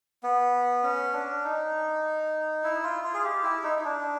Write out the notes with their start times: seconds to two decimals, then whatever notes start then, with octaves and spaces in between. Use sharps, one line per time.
0.23 B3
0.83 C#4
1.13 D4
1.44 D#4
2.64 E4
2.83 F4
3.04 F4
3.14 G#4
3.24 G4
3.43 E4
3.63 D#4
3.79 D#4
3.84 D4